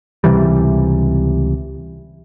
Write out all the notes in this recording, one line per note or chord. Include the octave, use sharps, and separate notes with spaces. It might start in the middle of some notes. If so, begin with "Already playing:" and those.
C#2 C3 E3 G3